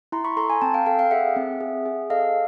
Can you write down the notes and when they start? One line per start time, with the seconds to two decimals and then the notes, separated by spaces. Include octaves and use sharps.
0.12 E4 A#5 C6
0.24 B5 C#6
0.37 A4 A#5 C6
0.50 G#5 A#5
0.61 C4 G5 A5
0.74 F5 G5
0.86 A4 F5 G5
0.99 F5 G5
1.11 G#4 E5 F#5
1.36 C4
1.61 G#4
1.86 G#4
2.10 A4 D#5 F5